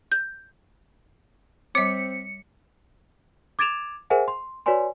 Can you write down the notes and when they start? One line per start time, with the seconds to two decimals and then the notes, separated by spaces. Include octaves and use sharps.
0.12 G6
1.75 G3 C4 C#5 D6 B6 C#7
3.59 D6 G#6 A6 D7 E7 F7
4.10 G#4 A#4 C5 E5 F#5 G#5
4.28 C6
4.66 F#4 B4 C#5 D5 G#5 C6